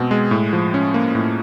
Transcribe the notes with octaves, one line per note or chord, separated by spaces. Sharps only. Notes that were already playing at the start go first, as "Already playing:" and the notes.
Already playing: B2 G#3 C4
G#3
A2
F3
C#4
A#3
A2